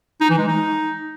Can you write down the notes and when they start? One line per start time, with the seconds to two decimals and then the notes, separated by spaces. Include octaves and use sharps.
0.21 D#4
0.30 E3
0.38 G#3
0.47 D#4